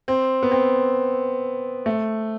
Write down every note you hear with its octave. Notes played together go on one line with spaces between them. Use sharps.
C4
B3
C4
A3